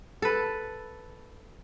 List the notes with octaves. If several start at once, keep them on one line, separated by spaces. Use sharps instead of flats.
A4 B4